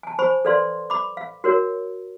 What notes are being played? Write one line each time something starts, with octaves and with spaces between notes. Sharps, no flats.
G#5 A5
C5 G#5 B5 C#6
A4 B4 D5 F5 C6
B5 D6
F5
F#4 A#4 C#5